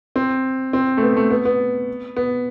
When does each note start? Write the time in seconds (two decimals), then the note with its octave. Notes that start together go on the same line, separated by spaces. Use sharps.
0.16 C4
0.73 C4
0.97 A3
1.03 B3
1.17 A3
1.31 B3
1.45 B3
2.17 B3